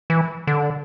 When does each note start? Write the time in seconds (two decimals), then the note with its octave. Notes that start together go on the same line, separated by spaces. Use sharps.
0.10 E3
0.47 D3